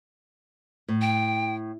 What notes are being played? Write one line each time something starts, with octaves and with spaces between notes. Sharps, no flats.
A2
G5